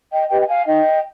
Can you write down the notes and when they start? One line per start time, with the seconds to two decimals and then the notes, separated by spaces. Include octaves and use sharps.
0.12 D#5 G5
0.29 G4 B4 D#5 G5
0.42 G5
0.48 F5 G#5
0.66 D#4 D#5 G5